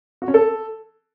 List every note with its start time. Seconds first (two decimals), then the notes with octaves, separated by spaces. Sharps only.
0.22 F#4
0.28 C#4
0.34 A4